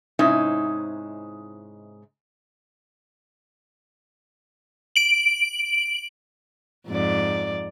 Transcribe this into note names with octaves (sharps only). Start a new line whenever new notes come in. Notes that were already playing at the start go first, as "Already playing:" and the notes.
G#2 C3 G#3 C#4 D#4 E4
D7 F#7
F2 G#2 D5